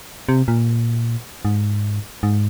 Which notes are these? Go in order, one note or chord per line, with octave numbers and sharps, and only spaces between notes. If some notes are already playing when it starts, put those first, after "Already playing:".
C3
A#2
G#2
G#2